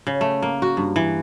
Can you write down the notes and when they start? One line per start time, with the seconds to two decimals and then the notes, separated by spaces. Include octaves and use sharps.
0.07 C#3
0.21 A3
0.42 A#3
0.62 F#4
0.77 G2
0.96 E3